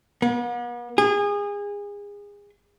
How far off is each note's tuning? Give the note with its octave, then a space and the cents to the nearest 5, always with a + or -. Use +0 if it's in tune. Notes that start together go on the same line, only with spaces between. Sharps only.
B3 -45
G#4 -30